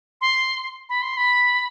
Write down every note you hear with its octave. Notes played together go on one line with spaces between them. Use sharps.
C6
B5
C6
B5